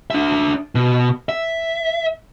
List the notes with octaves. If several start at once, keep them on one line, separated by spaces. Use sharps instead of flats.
D4 E5
B2
E5